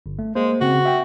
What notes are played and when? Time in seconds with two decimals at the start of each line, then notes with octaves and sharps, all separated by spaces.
0.06 G1
0.19 A3
0.35 G#3 A#3 C5
0.61 C#3 C4 F#4
0.85 E5 G5